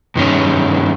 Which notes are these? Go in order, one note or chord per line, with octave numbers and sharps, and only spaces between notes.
G2 D#3 C#4